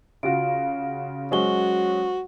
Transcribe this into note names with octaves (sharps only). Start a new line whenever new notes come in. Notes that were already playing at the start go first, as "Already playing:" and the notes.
C#3 F4 F#4 F5 D7
F#3 G#3 C#4 F#4 C5 C#6 G7